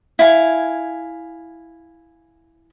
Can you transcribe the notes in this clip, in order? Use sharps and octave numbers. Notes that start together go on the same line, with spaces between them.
E4 F5 G#5